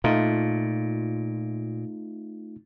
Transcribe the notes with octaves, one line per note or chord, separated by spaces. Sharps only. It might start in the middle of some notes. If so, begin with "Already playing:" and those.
A#2 A3 D#4 F4